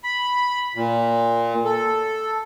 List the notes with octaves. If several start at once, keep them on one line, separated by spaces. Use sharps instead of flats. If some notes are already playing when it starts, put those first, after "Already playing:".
B5
A#2
A4